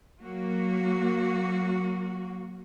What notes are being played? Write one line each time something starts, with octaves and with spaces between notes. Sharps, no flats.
F#3 A#3 F#4